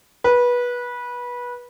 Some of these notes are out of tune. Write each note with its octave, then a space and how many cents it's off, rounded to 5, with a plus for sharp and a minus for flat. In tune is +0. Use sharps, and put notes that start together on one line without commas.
B4 -20